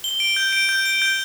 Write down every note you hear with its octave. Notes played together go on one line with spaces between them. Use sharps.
G7
D7
G6
D7
G6
G7
G6